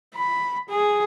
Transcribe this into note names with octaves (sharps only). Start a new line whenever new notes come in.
B5
G#4